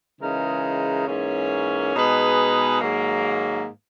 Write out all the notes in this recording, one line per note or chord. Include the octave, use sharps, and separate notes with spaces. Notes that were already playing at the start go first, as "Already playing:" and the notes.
C#3 E3 G#3 D#4 A#4
G#2 E3 A#3 C#4
B2 G#3 D#4 G#4 B4
G#2 D#3 F#3 A#3